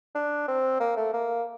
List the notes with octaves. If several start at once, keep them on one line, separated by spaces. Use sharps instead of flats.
D4
C4
A#3
A3
A#3